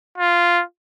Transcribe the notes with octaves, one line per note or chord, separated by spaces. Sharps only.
F4